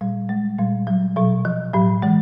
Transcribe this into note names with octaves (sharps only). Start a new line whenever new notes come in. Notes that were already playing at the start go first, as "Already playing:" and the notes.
A#2 G3
G#3
A#2 G3
F#3
B2 F#3
F3
A2 F#3
E3 G#3